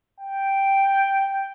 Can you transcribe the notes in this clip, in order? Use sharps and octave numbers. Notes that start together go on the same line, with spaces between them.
G5